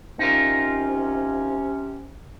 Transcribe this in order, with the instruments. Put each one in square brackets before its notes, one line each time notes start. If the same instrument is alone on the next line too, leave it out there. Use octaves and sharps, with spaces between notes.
[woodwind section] C3 C#4 [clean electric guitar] D#4 F4 A#4